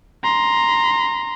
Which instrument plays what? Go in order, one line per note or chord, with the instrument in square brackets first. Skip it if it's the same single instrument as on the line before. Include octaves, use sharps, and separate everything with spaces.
[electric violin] A#5 C6